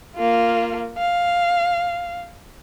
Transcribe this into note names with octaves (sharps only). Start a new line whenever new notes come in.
A#3 F4
F5